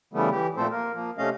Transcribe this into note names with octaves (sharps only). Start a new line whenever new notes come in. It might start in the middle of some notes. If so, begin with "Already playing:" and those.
C#3 E3 G3 A3 B3
E3 G4
A#2 F3 A3 C4 A4 C5
A#3 A#4
F3 A#3
C3 A3 C#4 D#5 F5